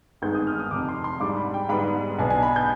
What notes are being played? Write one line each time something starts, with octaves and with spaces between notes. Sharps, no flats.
G#1 G2 D#3 G#3 B3 G6
D#6
F6
D#6
F1 F2 C3 D6
C6
C6
G#2 G3 D4 D6
B5
G5
G#2 G3 B3 B5
B1 B2 B3 D4 G#5
G#5
B5
G6